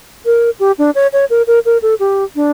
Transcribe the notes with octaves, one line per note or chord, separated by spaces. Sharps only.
A#4
G4
D4
C#5
C#5
A#4
A#4
A#4
A4
G4
D4